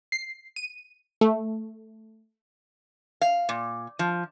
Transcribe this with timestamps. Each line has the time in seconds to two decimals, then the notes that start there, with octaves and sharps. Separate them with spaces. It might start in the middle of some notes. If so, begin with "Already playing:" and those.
0.12 C7
0.56 D#7
1.21 A3
3.21 F5
3.49 A#2
3.99 F3